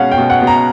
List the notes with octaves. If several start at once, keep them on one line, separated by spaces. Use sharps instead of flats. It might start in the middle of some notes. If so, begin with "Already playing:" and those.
Already playing: B2 G#3 C#4 F5 F#5
G5
B2
F#5
B2
A#5